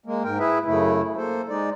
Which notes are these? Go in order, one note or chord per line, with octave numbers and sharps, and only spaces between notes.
G#3 A#3
G#2 A#4 G5
E4 G#4 B4 E5
F#2 C#3 A3 E4
A#3 A4 C5
G#3 D#4 D5